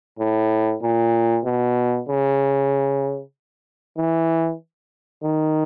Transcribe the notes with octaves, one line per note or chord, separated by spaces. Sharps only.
A2
A#2
B2
C#3
E3
D#3